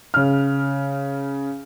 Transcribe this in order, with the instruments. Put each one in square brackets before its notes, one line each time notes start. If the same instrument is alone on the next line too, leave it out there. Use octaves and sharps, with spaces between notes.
[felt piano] C#3 F6